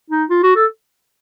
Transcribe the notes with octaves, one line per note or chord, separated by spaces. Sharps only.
D#4
F4
F#4
A4